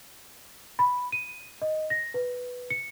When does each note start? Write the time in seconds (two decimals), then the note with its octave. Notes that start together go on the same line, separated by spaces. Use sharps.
0.79 B5
1.12 D#7
1.62 D#5
1.90 A#6
2.14 B4
2.70 C#7